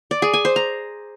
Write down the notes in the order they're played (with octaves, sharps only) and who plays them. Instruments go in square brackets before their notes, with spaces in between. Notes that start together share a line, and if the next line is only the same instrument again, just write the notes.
[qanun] D5
G#4
G#5
C5
A#5